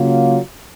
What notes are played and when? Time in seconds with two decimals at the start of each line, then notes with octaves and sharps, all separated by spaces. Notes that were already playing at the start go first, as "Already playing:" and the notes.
Already playing: C#3 F#3 A#3 F4